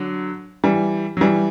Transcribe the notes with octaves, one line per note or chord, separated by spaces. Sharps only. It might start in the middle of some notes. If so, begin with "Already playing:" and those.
Already playing: D3 F#3
E3 G3
F#3
E3 G3